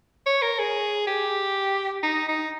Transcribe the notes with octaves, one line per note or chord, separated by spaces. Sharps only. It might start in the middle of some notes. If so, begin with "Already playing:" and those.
C#5
A#4
G#4
G4
D#4
D#4